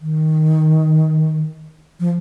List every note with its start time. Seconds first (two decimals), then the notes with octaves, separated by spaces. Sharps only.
0.01 D#3
2.00 F3